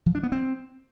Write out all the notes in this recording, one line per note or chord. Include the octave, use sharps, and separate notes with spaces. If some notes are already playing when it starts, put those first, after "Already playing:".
F3
D4
B3
C4